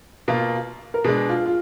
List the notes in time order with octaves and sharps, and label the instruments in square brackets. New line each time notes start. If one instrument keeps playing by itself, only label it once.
[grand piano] B2 A#3 F4
[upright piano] A#4
[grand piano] B2 G#3 D4 [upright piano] G#4
[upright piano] F4
F4